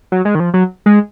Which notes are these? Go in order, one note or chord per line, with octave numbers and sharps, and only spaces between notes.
F#3
G#3
D#3
F3
F#3
G#3